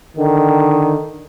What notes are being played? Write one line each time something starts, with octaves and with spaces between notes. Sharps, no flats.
D3 D#3